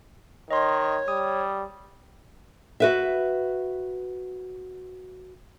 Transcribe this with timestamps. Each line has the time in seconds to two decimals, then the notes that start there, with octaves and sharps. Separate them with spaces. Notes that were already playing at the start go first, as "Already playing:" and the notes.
0.50 D#3 C#5 D#5 C6
1.08 G3 D#6
2.80 F#4 B4 E5